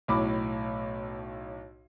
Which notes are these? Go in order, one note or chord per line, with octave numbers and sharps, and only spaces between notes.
B1 A2 B5 D6